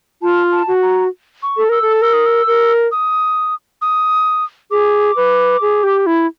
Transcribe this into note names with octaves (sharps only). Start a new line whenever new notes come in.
F4 A5
A5
F#4
A#5
C#6
A4
A#4 E6
A4
A#4 E6
D#6
E6
A#4
D#6
D#6
G#4 D6
B4
G#4
G4
E4